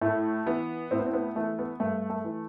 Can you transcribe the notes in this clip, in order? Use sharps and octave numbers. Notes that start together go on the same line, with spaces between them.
A2 A3
E3 B3
A2 C4
B3
C4
B3
E3 A3
B3
G2 A3
A3
E3